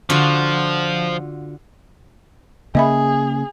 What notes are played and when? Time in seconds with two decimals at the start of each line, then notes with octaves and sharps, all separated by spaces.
0.10 D3 F3 F4 F#4
2.75 C#3 A#3 C#4 G#4 D#5 E5 B5